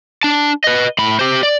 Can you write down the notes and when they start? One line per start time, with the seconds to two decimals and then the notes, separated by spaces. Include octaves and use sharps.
0.23 D4 A5
0.64 B4 D#5
0.98 A2 B5
1.19 G4 C5
1.43 D5